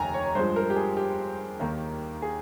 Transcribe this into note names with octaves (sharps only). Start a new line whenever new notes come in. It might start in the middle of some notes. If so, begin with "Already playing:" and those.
Already playing: F1 D#2 C#3 G5 G#5 A#5
C#5
G2 F3 G#3 C5
A#4
G4
G#4
G4
D#2 D#3 A#3
G#4